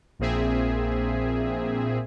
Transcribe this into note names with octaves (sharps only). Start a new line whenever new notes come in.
A#1 A#2 C4 G#4 E5